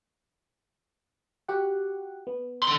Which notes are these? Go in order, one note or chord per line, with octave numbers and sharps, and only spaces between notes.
F#4 G4 F#5
B3
D3 C6